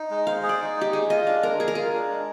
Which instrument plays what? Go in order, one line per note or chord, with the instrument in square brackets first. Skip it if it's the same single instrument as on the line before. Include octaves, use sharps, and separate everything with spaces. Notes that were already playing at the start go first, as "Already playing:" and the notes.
Already playing: [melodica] D#4
G#3
[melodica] C5 [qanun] F5
[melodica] G#4
[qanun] D5
[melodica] D#4
[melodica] G#3 [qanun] G4
[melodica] G#3 [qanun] G#4
[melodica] F4 [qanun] D#5
[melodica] D4 [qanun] F5
[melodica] G#3 [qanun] A#4
[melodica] G#3 [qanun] G#4
[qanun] A#4
[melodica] F4 [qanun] G#4
[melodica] D4
G#3